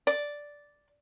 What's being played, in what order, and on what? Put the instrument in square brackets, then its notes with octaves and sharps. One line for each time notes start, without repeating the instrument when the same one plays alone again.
[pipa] D5